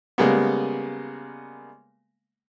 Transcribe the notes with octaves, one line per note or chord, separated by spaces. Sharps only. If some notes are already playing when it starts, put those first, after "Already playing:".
C#3 G3 G#3 A#3 B3